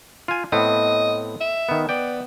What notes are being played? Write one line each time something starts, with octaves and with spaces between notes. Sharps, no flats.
F4 G#5
A2 B3 C4 D#5
E5
D#3 B3
B3 D5 G5